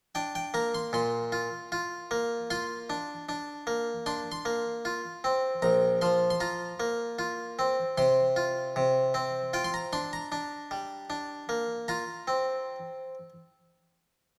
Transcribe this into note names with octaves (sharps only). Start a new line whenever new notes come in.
D4 G5
G5
A#3 A#5
C6
A#2 C6
F4
F4
A#3
F4 C6
D4
D4
A#3
D4 C6
C6
A#3
F4
C4
A#1 A#5
F3 C6
C6
F4 A#5
A#3
F4
C4
C3 C6
F4
C3
C4
F4 G5
C6
A#5
D4 C6
A#5
D4
G3
D4
A#3
F4 A#5
C4